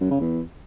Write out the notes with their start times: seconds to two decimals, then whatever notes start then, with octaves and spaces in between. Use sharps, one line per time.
0.01 F#2
0.11 C#3
0.20 E2